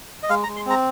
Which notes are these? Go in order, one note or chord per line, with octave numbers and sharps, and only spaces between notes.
D#5
G#3 F5
A#5
G#3
C6
C4 A#5